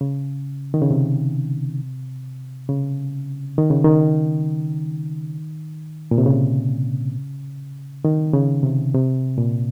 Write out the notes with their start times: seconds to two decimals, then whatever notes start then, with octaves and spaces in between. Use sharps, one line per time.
0.01 C#3
0.74 D#3
0.81 C#3
0.91 C3
2.69 C#3
3.58 D#3
3.70 C#3
3.84 D#3
6.11 A#2
6.18 C3
6.26 C#3
8.05 D#3
8.34 C#3
8.63 C3
8.94 C3
9.38 A#2